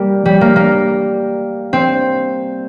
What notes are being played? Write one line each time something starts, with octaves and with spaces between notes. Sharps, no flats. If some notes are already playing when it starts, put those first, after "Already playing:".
Already playing: G3 A#3
G3
A#3
A#3
C4